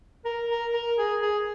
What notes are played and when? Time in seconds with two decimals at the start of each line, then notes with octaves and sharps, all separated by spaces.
0.25 A#4
0.50 A#4
0.73 A#4
0.98 G#4
1.21 G#4